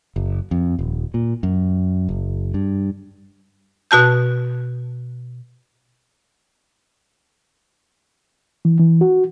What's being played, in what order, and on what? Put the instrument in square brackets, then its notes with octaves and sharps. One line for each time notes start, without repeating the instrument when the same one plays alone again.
[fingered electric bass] F#1
F2
D#1
A#2
F#2
F#1
G2
[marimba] B2 F#4 A5 G6
[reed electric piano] E3
E3
F#4